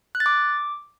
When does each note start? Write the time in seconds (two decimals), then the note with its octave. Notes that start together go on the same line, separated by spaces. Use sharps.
0.15 F#6
0.20 A6
0.26 D6